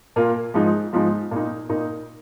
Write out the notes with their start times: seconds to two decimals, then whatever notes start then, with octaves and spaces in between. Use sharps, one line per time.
0.16 A#2 A#3 F4
0.54 G#2 F3 G#3 D#4
0.93 G#2 F3 G#3 D#4
1.31 A#2 A#3 D#4
1.69 A#2 A#3 D#4